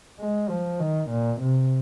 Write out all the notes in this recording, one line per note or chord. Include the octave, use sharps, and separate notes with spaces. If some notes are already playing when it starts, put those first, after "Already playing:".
G#3
F3
D#3
A#2
C3